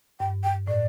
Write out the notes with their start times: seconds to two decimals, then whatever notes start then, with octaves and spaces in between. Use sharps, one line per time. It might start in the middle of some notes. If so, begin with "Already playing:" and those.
0.20 G2 G5
0.44 G5
0.67 A2 D5